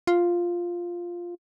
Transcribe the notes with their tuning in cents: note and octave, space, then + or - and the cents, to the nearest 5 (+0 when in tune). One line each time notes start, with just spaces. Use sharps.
F4 +0